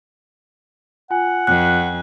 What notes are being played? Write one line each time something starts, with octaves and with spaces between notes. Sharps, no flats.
F4 F#5 G#5
F2 F#6